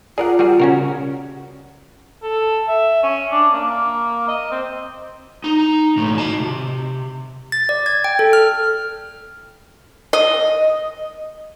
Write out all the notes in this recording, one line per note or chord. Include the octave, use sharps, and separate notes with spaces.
F4 G#4 A#4 D5 F#5
G3 F#4 G#4
C#3 C#4 F#4 A#4
A4
E5
C#4
D4
A#3
D#5
C4
D#4
B1 A2
D#5 A5
C3
A6
D5
G#6
G5
A4
F6
D#5